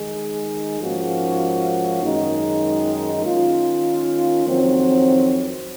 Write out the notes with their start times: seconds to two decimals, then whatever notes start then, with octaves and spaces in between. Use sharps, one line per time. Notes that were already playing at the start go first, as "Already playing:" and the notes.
Already playing: D#3 G#3 D#4 G#4
0.80 G#2 F3 A#3 C#4 F#4
2.02 F#2 D#3 G#3 D#4
3.23 D#3 A#3 C#4 F4
4.46 F2 D#3 F#3 C4